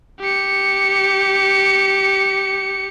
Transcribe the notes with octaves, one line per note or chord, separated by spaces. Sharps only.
G4 C#7